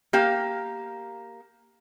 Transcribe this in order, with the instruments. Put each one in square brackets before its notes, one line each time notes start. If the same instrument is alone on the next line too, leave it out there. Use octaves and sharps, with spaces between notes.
[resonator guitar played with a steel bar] A#3 G4 F5